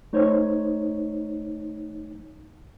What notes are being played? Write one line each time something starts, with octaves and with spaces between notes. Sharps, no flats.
A3 D#4 C5 C#5